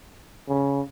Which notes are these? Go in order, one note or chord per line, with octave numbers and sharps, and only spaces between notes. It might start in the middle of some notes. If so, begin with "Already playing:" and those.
C#3